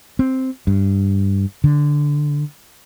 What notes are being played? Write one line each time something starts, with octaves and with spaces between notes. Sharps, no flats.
C4
G2
D3